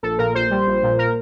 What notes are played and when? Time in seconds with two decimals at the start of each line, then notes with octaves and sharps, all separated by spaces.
0.03 A#1 A4
0.18 A#2 A#4
0.35 A#1 C5
0.51 G3
0.67 A#1
0.83 A#2
0.98 A#4